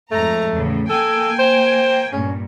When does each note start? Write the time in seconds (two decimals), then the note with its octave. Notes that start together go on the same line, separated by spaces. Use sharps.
0.11 F2 G#2 A3 A#5
0.54 E2 A2 C#3
0.90 A#3 A4 G5 G#5
1.39 C5
2.13 G2 A#2 C#4